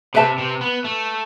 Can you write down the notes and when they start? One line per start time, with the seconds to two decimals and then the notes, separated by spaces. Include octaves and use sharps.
0.14 C3 B4 E5 A5
0.38 C3
0.61 B3
0.84 A3